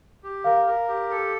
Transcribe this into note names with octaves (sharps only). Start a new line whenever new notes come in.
G4
A#4 F5
A#4
G4
A4